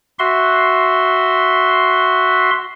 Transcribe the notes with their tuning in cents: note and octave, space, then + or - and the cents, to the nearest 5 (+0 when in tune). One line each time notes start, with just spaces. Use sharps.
F#4 +0 E5 +0 C6 +0